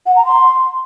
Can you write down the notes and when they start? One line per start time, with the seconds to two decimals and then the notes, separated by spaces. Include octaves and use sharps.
0.06 F#5
0.16 A#5
0.26 C6